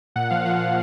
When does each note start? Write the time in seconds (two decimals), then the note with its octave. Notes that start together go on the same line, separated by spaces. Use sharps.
0.16 A#2 F#5
0.30 F3 F5
0.46 F3 F#5
0.61 A#2